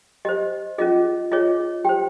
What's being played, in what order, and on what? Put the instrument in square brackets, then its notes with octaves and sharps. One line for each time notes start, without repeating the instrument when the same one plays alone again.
[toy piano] G4 C5 D#5
C#4 F4 G#4 D#5
F4 G#4 C#5 D#5
G4 C5 G5